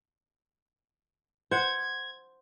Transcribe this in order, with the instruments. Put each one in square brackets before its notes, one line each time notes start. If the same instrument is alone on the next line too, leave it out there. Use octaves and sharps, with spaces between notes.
[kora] C5 F#5 [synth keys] G#6